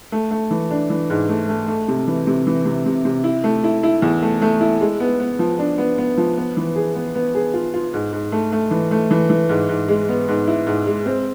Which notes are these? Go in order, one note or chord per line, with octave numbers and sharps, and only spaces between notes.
A3
A3
E3
D4
E3
G#2
A3
A3
A3
C3
E3
C3
E3
C3
C3
C3
E4
A3
E4
E4
E2
A3
A3
E4
G#3
B3
B3
F3
D4
B3
B3
F3
B3
E3
G#4
B3
B3
G#4
F4
F4
G#2
G#2
A3
A3
E3
A3
E3
E3
G#2
G#2
G#3
B3
G#2
E4
G#2
G#3
C4